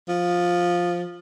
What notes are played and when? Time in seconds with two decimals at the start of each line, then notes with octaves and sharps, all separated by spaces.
0.09 F3